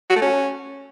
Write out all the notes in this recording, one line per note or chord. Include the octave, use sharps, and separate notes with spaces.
F#4
A3
C#4